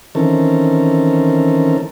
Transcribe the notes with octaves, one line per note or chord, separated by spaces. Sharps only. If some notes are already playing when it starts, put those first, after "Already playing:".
D#3 E3 C4 C#4 A4 A#4